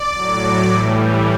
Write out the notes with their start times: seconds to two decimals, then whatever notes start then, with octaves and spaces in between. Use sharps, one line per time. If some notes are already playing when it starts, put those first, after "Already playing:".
Already playing: D5
0.14 A2 F#3
0.69 A2 E3 G3